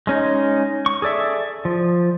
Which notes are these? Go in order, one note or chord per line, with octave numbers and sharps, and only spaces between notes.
G#3 C#4 D#4
C#6
G#4 A4 D5 E5
F3